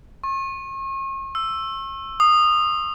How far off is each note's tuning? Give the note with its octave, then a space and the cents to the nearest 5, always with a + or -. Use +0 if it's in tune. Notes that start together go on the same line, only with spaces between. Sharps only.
C#6 -40
E6 +5
D#6 -20